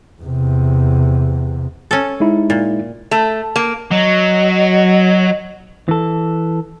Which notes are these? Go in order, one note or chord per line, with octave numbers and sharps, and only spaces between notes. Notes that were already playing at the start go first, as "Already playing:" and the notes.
E2 C3
C#4 A4
G#3 D#4 E4
A#2
A3
A#3
F#3 D#5
E3 A4